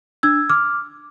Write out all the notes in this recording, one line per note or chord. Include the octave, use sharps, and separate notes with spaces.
D4 E6 G#6
D6 F6